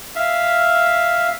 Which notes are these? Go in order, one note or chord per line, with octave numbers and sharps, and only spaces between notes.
E5 F5